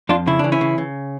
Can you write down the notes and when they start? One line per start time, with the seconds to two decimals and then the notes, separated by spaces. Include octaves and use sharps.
0.09 F2 D4 F4
0.27 C#3 E4
0.39 E3 D4
0.52 C#4 E4
0.61 C#3
0.78 C#3